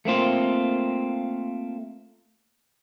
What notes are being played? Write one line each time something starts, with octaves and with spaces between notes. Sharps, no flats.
A3 A#3 C4 F4